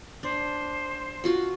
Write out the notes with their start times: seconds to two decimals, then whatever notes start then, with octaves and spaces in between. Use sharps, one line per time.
0.23 D4 C5
1.24 F4 F#4 F#5